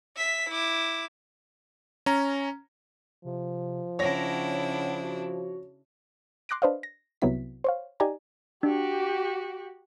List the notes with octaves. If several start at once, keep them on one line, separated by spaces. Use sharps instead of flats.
E5 B6
E4 D6
C#4 A#5
C3 F3
C#3 D4 E4 C#5 F#5 A#6
F#4
C6 D6 F#6 A#6 D7
D4 B4 C5 D#5 F5
A#6
C2 C3 F#3 B3 E4 B6
C5 C#5 F5
D#4 G4 D5 G5 G#5 A#5
D4 F#4 G4